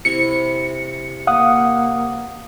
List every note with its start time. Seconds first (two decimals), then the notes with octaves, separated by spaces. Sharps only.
0.05 C3 E4 C#6 C#7
1.27 A#3 F5 F#5 D#6